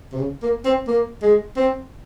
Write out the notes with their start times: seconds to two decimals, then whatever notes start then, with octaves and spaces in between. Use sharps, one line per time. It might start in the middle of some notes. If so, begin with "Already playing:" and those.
0.12 C3
0.19 C#3
0.42 A#3
0.65 C4
0.87 A#3
1.22 G#3
1.56 C4